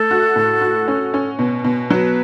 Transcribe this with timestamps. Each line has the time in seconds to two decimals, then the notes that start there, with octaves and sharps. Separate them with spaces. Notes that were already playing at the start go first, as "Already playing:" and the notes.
Already playing: A3 A4
0.11 F#4
0.36 A2
0.61 F#4
0.88 C#4
1.14 C#4
1.39 B2
1.64 B2
1.90 F#3 B4